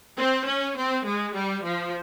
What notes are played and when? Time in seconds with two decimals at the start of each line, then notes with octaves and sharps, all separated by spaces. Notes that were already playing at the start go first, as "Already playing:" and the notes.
0.18 C4
0.48 C#4
0.77 C4
1.07 G#3
1.36 G3
1.66 F3